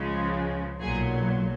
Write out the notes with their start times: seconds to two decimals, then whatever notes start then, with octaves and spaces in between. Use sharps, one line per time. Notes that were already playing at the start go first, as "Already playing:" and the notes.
Already playing: C#2 C#3 F3 G#3
0.80 B1 A#2 F#3 G#4